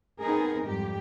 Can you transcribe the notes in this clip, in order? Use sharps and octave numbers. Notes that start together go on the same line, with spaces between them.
B3 C4 D#4 G#4 A#4
F2 G#2 G3 G4